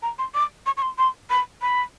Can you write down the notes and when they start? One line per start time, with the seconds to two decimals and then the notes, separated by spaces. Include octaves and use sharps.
0.02 A#5
0.19 C6
0.34 D6
0.66 C#6
0.77 C#6
0.82 C6
0.98 C6
1.30 B5
1.62 B5